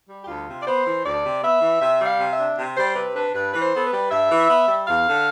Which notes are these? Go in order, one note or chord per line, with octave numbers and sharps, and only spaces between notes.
G3
G4
D2 F4
C3
D5
B3 C5
E3
D2 D5
C3
B3 E5
E3
C3 E5
G3
F5
C3
E5
D4
C3
G3 C5
C3 B4
D4 B4
G2 B4
E3 B4
C5
B3 A4
B4
G3
G2 E5
E3
B3
G3
E2 F5
D3